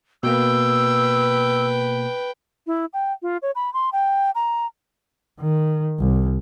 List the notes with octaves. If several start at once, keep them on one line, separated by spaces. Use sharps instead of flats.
B2 A#3 B4 G5 E6
E4
G5
F4
C#5
B5
C6
G5
A#5
D#3
C2